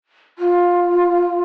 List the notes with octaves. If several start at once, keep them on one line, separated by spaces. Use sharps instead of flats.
F4